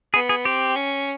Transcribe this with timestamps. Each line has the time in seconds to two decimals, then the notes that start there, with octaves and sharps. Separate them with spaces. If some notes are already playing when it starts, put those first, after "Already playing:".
0.14 B3 G#4
0.29 G#4
0.45 C4 G4
0.76 C#4